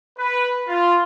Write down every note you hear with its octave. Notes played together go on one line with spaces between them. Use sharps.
B4
F4